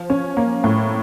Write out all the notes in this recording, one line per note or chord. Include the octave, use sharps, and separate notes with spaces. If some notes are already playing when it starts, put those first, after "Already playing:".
Already playing: F3
C#4
A#3
A2